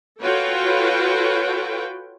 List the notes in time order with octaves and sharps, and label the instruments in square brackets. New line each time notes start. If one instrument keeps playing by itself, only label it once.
[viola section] F4 F#4 A4 B4 C#5 G5